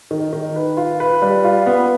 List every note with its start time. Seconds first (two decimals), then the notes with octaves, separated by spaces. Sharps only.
0.11 D#3
0.33 D#3
0.56 B4
0.77 F4
1.00 B4
1.22 G3
1.44 F4
1.66 B3